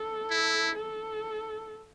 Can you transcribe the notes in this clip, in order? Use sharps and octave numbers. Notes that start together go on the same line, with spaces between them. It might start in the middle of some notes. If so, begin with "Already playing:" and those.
Already playing: A4
E4
A4